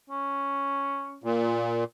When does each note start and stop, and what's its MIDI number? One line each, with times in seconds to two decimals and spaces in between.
0.10 1.21 61
1.24 1.84 46